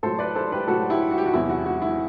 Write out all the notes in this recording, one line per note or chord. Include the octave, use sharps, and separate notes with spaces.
A2 F#3 A4 C5
B4 D5
A4 C5
G4 B4
A2 F#3 F#4 A4
E4 G4
F#4
G4
F#4
E2 C3 F#3 E4
F#4
F#4
E4